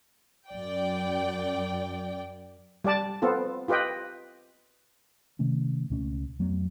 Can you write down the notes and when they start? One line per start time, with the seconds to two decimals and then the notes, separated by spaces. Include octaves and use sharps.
0.49 F#2 D5 G5
2.84 G3 G4 D5 A5
3.22 B3 C4 F4 A4
3.68 F4 G4 B4 D#5 G5
5.39 C3 D#3 A3 C#4
5.90 C#2 B2 A3 C#4
6.39 F2 F#3 A3 B3